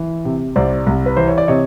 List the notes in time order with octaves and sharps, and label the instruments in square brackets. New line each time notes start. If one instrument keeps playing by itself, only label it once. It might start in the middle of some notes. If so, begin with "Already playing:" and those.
Already playing: [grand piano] E3
C3
C2 C5 D5
C2
B4
E3 C5
C#5
D5
C3 C#5 D#5